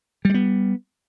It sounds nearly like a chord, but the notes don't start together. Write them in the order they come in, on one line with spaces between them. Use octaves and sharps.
G3 G#3 B3